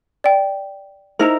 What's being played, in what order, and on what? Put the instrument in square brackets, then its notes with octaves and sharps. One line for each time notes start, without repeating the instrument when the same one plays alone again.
[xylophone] D5 G5
[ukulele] D#4 E4 A#4 [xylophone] C5 A#5